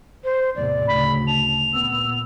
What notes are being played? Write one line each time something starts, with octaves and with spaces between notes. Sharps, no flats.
C5
E2 A2 C3 D5
D2 C#3 B5
A5 F7
A#2 B3 E6